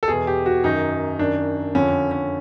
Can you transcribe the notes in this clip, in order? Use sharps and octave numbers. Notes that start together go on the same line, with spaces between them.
A4
E2 B2 G#4
G4
F#4
F#2 D#3 D#4
F#2 D#3 D4
F2 D3 F3 C#4
C#4